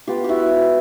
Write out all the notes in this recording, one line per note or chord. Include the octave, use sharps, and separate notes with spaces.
B3 F4 G4
E4 F#4 G4